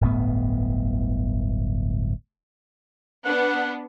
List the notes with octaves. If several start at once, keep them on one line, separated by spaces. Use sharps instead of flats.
D1 G1 A2 B3
B3 D4 F#5